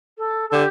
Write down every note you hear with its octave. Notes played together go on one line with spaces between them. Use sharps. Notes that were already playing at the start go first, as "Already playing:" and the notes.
A4
A4
D3 G4